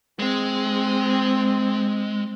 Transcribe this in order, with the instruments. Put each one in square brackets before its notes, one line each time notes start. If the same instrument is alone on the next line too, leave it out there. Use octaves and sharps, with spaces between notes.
[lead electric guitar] G#3 [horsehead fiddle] C4